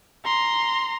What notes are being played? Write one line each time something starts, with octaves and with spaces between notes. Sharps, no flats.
A#5 C6